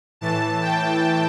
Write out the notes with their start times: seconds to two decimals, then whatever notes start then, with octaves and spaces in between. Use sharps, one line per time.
0.21 A2 E3 A5
0.62 G5